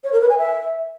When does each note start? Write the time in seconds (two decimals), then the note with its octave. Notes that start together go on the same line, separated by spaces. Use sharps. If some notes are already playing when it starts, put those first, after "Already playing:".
0.04 C#5
0.13 A#4
0.21 B4
0.30 G#5
0.38 E5